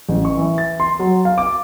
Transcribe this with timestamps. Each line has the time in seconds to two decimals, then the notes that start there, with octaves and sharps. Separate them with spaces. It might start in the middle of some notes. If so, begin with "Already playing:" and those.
0.09 A1
0.25 C#6
0.37 E3
0.58 A6
0.80 C6
0.99 F#3
1.25 F5
1.38 D6